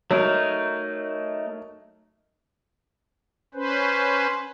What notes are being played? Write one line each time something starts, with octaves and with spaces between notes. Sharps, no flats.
F#3 A3 D#4 A#4
C#4 B4 C5